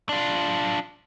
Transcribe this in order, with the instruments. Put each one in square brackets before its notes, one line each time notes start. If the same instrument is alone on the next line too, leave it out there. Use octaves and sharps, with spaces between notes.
[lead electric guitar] D4 F4